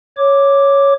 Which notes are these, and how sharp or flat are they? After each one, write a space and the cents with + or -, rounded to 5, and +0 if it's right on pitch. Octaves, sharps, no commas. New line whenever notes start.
C#5 +0 D6 +0